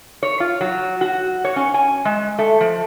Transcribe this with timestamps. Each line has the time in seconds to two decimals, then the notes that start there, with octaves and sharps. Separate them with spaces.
0.23 C#5
0.40 F4
0.61 F#3
1.01 F#4
1.45 C#5
1.56 C#4
1.74 G#5
2.05 G#3
2.39 A3
2.61 F3